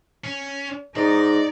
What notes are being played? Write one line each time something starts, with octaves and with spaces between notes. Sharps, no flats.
C#4
G#2 D#4 D5